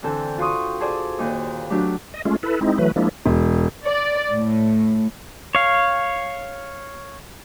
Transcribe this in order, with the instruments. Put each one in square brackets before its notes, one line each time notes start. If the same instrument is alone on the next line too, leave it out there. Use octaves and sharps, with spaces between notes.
[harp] D3 E3 C4 A4 G5
F4 F#4 G5 C6 C#6 D#6
G#4 A4 C5 D5 G#5
D#2 A#2 D#4
F#3 A3 D4 G4
[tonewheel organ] D#5
G#3 A3 C#4 F4
E4 A4 B4
G#3 C4 D#4 E4
E3 F#3 A3 B4
F3 G#3 A#3 D4 E4
[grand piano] E1
[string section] D5
A2
[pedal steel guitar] C#5 F5